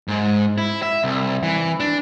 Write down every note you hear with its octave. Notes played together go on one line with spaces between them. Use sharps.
G#2
E4
E5
C2
E3
D4